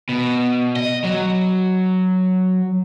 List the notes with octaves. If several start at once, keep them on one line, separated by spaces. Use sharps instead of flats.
B2
D#5
F#3